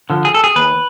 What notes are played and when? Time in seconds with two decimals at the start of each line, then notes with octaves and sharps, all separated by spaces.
0.10 D3 F3
0.25 G#4
0.34 A4
0.44 G#4
0.56 D#2 B4